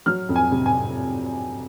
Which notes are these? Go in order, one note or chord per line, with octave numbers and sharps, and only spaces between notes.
F#3 F6
F2
G#5
C3
G#5